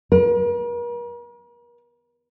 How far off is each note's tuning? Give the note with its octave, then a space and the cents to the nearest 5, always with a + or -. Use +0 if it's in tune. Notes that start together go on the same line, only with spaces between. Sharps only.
A#4 +45